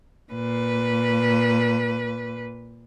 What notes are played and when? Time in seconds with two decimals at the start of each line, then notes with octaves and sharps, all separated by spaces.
0.33 A#2 B4